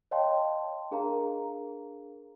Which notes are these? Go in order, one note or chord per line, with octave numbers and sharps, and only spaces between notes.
C#5 D#5 F5 G5 A5 C6
D4 G#4 A#4 F5 A#5